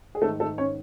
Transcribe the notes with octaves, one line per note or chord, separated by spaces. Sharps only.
G#4
G#2 D#3 A3 A4
A3 A4
C#4 C#5